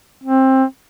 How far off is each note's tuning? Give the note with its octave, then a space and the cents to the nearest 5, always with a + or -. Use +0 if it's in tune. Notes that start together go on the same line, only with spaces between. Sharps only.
C4 +20